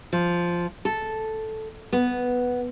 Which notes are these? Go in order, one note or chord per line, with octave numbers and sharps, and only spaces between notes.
F3
A4
B3